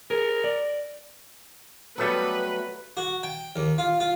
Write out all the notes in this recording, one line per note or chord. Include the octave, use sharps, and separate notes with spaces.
G#4 A#4
D5
F#3 G3 A3 B3 A4 B4
F#4
G5
D#2
F4
F4